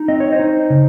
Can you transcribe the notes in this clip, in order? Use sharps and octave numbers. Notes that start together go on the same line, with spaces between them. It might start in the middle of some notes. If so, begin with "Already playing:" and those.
Already playing: D#4
C4 D#5
C#5
C5 D#5
D#4
C#3